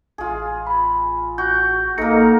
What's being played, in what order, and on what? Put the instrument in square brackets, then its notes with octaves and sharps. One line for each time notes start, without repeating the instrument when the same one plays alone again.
[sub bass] A1 [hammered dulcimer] F4 G#4
[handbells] B5
[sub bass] A1 [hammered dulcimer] F#4 [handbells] G6
[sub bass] A1 [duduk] A#3 [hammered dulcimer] D#4 A#4 [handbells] A4 A#6 C#7